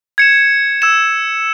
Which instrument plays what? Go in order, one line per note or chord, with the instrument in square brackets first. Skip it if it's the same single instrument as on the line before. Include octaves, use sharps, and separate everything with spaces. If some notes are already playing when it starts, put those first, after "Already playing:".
[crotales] G#6 C#7 E7
E6 G#6 E7